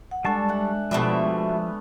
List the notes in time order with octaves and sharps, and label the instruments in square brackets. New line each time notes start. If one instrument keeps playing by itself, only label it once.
[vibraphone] F#5
[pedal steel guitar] G3 A5 C#6 [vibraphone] G#3 [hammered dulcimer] D4 A4
[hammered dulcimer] E5 F#5
[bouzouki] B2 D4 E5 [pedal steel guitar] F3 [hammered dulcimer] G3 A3 B3